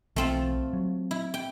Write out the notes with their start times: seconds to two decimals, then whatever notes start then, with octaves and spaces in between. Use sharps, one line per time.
0.16 B1 E3 A3 C4 F4
0.73 F#3
1.11 E4
1.34 G5